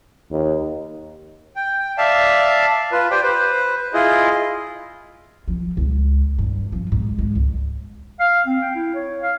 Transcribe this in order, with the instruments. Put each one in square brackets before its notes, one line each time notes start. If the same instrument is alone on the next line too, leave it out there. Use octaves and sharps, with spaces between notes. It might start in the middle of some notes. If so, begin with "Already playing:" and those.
[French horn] D#2
[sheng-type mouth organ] G5
D5 E5 F5 A5
F4 B4
G4 C5 D5 G5
B4 C5
E4 F4 G#4 D#5
[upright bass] F3
C#2
G2
F3
G#2
G#3
C#2
[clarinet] F5
C4
G5
E4
C#5
F5